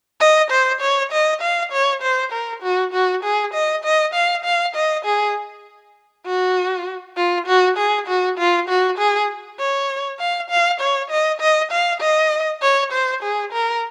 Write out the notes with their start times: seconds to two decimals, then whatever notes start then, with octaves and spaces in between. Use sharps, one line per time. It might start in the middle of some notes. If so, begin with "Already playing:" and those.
0.20 D#5
0.51 C5
0.81 C#5
1.12 D#5
1.42 F5
1.72 C#5
2.02 C5
2.32 A#4
2.62 F#4
2.93 F#4
3.23 G#4
3.54 D#5
3.84 D#5
4.14 F5
4.45 F5
4.75 D#5
5.05 G#4
6.26 F#4
7.17 F4
7.47 F#4
7.77 G#4
8.07 F#4
8.38 F4
8.68 F#4
8.98 G#4
9.59 C#5
10.19 F5
10.50 F5
10.81 C#5
11.10 D#5
11.40 D#5
11.71 F5
12.01 D#5
12.62 C#5
12.92 C5
13.23 G#4
13.53 A#4